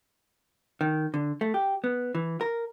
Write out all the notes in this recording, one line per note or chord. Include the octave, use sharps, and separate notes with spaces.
D#3
D3
A3
G4
B3
E3
A#4